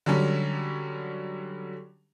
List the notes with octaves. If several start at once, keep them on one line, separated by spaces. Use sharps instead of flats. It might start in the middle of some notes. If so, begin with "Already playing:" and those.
D3 F#3 G3 C#4